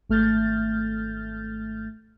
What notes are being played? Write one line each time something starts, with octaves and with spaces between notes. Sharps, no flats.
G#1 A3 F6 G6 A6